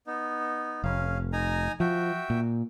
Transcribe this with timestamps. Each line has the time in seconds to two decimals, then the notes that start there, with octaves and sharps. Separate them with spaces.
0.07 B3 D#4
0.84 F1 C#4 F5
1.33 D#4 G#5 A#5
1.80 F3 F#4 E5 G5
2.30 A#2